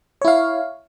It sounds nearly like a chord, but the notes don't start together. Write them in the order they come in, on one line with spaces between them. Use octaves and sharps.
C#5 E4 F5